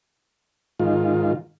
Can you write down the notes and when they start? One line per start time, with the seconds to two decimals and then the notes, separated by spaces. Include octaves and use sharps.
0.80 G#2 D#3 F4